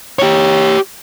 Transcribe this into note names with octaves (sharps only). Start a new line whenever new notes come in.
G4 C#5